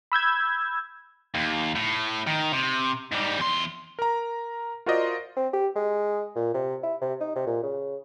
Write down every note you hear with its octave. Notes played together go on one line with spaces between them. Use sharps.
B5 E6 G6 G#6
D#2
A2
D#3
C3
G#2 G3
E2 C6
A#4 A#5
F4 F#4 A#4 C5 D5 D#5
C4
G4
G#3
A#2
C3
E4
C3
D#4
C3
A#2
C#3